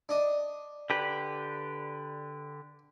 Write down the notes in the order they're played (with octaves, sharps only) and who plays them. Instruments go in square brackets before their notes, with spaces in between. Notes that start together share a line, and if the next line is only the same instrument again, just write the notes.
[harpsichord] D4 D#5
[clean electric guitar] D3 G4 B4